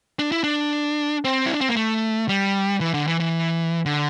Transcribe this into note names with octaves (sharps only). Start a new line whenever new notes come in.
D4
E4
D4
C4
E4
D4
C4
A#3
A3
G3
E3
D3
E3
E3
D3